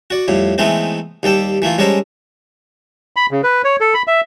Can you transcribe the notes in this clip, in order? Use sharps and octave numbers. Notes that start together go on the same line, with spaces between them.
F#4 D5
F2 A2 G3
E3 G#3 A3 B3 C4 D#4
D#2 G3 A4 G5 A5
E3 A3 A#3 F4
G3 G#3 C#4 A4 A#4 C5
B5
C#3
B4
C#5
A4
B5
E5